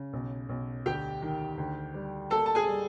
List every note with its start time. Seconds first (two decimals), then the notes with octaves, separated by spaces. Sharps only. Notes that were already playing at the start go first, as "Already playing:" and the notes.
Already playing: C#3
0.13 B1
0.49 B1
0.86 D2 G4 G5
1.22 D#3
1.58 D2
1.94 G3
2.30 A#3 A4 A5
2.46 A5
2.55 G#4 G#5
2.68 G3